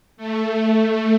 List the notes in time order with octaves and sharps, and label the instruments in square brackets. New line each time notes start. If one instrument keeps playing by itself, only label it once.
[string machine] A3